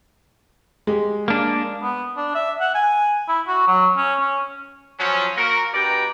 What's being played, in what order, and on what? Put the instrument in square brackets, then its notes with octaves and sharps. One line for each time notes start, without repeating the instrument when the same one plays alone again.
[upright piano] G#3 G4
[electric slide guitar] A#3 D4
[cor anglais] B3
D4
E5
F#5
G#5
E4
F#4
F#3
C#4
C#4
[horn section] F3 F#3 C#4
A#3 F#4 A#4
G2 B2 D5 G5 A#5